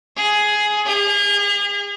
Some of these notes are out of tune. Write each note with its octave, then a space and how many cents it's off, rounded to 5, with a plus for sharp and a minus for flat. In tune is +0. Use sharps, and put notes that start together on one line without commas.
G#4 +10
G#4 -40